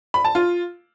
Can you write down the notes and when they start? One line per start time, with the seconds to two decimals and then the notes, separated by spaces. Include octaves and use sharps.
0.14 B5
0.25 A5
0.35 F4